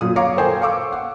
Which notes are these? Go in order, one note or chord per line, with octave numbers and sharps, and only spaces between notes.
F#2 A#2 D#6
C#5 F5 A#5 C#6 D6
A4 A#4 C5 G5 G#5
F5 C#6 D6 E6
F#5